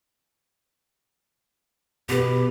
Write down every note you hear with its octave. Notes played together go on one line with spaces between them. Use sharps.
B2 G4 B4